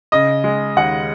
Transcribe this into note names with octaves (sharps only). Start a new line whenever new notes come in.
C#3 D#5
G#3
D#2 F#5